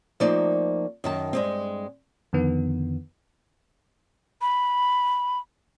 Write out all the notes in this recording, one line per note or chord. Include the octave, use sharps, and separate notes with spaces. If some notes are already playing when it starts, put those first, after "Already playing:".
F3 A3 A#3 C4 D#4 D5
F#2 D#3 A5
G2 G#3 C4
F2 D3 D#3 B3
B5